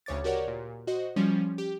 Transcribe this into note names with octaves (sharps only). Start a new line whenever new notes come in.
D2 C#3 C#5 D6 A6
F#4 G4 A#4 C#5 D5 F#5
A#2
F#4 C5 D#5
F3 G3 C#4
G4